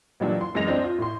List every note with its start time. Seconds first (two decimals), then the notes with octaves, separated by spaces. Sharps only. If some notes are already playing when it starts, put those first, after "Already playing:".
0.20 A#2 E3 F#3 G3 D4
0.41 C6
0.55 F#2 E3 G#3 A#6 F7
0.67 C4 D4 C5 D#5
0.84 F4
0.98 A2 C6